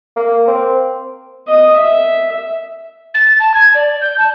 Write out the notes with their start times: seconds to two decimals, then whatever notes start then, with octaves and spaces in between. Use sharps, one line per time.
0.16 A#3
0.48 C4
1.48 D#5
1.77 E5
3.14 A6
3.40 A5
3.54 G#6
3.75 D5
4.01 G6
4.18 A5